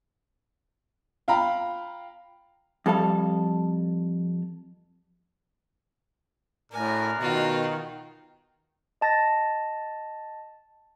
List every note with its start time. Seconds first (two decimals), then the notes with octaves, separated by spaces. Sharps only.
1.28 F4 F5 G5 A#5 B5
2.86 F2 G3 A4 F5
6.72 F#2 A2 D4 A#4 G#5
7.20 B2 D#3 F4 F#4
9.01 D#5 A5 A6 A#6